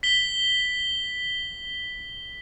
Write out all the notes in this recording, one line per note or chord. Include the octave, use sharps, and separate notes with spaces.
B6 G7